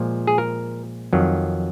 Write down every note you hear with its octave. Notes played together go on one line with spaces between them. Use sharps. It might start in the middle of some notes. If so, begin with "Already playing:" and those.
Already playing: A#2 F3 G#3
G#4
A#4
F2 D#3 F#3